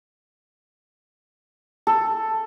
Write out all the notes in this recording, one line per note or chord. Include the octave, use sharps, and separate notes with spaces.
A4